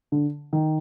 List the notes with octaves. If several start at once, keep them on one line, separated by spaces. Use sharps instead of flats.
D3
D#3